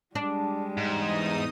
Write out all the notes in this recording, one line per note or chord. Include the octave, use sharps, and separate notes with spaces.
G3 G#3 D4
E2 G#2 D#4 D#6